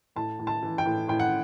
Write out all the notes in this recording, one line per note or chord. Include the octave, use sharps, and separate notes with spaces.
A2 A5
A2
A5
E3
G5
A2
A2 G5
F#5